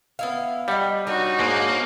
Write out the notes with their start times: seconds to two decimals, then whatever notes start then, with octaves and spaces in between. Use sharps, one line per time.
0.19 B3 E4 F5
0.68 G3 D#5 F#5
1.07 D4 D#4 F#4 A#4 C#5
1.40 G#2 A#3